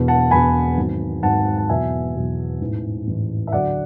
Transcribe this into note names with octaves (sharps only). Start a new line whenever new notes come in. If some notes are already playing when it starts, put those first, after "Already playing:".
Already playing: E1 E2 B2
F#5 A5
E1 E2 B2 G#5 B5
G#1 G#2 F#3
G#1 G#2 F#3 F#5 A5
A5
E2 B2 F#3 E5 G#5
E2 B2 F#3
A1 G#2 E3
A1 G#2 E3
E5
D2 D3 F#3 D5 F#5